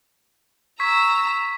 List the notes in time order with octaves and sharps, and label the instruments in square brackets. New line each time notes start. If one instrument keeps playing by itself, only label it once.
[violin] A#5 E6 [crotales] C#6 G#6 B6